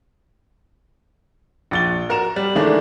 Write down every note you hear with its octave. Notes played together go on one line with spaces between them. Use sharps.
A#1 A6 G7
F#4 A#4 A#5 E7
G3
D#3 E3 G#3 A3 D4